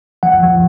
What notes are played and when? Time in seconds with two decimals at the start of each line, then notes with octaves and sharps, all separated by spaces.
0.23 F3 F#5
0.43 F3